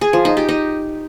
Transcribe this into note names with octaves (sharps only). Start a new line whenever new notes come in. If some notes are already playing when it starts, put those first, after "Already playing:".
G#4
F3
D#4
G4
D#4